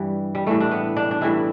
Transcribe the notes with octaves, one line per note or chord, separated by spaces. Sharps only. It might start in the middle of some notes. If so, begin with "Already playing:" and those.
Already playing: G2 E3 G3
G3
A2 E3 G3 A3
D4
B3
D4
D4
A2 E3 G3 E4